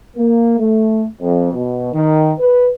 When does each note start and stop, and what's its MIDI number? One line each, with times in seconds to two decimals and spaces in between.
0.16 0.55 58
0.58 1.05 57
1.21 1.52 41
1.53 1.90 47
1.93 2.31 51
2.39 2.69 71